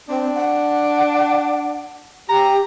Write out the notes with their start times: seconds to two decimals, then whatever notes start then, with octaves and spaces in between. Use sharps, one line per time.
0.09 C4 D4
0.35 F#5
2.29 G4 A#5